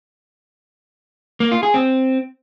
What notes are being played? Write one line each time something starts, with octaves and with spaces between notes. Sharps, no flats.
A#3
F4
G#4
C4